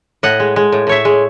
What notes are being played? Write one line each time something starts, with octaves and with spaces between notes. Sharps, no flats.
A2 D#5 F#5
G#3
G#3
A2
A2 C#5 E5
G#3